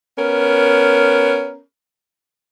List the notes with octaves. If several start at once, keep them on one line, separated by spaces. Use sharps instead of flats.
B3 C#4 A#4